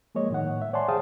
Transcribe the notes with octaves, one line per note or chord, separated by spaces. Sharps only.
F3 G#3 A#3 C#5 D#5
A2 D#3 F#5
E5
C#5 D5 F#5 G#5 A5 C6
G#4 C5 F5 G5 A5 D#6